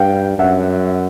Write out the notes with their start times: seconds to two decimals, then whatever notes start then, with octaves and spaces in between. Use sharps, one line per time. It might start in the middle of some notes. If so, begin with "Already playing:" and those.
Already playing: G2 F5 G5
0.38 F#2 E5 F#5